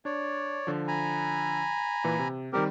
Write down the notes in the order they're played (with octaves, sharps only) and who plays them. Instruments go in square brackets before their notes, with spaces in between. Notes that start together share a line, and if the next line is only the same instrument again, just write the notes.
[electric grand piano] D4 [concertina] C#5 D5
[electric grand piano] D3 F3
[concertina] G#5 A#5 B5
[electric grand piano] A#2 E3 B4
C3
[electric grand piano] D#3 G3 C4 [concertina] G4 A#4